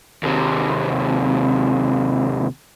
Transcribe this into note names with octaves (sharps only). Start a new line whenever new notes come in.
D#2 C3